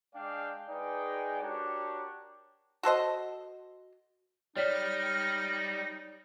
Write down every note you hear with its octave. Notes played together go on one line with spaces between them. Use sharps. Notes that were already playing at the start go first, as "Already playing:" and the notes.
G#3 D4 D5 F5 G5
G#3 D#4 G#4 B4 D5 G5
D4 F#4 G4 A#4 C#5 D5
F#4 A4 C5 D#5
G3 D#4 C#5 D5 F6 B6